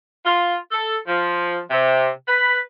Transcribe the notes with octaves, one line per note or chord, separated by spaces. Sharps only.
F4
A4
F3
C3
B4